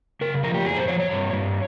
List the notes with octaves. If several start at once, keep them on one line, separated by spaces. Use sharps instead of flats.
C#3 A#4
F3 A#4
G4
F2 G#4
C5
F3 C#5
C#5
G2
G2